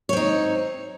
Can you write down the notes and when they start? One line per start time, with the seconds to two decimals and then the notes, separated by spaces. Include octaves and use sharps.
0.09 C#5
0.13 C4
0.17 D#4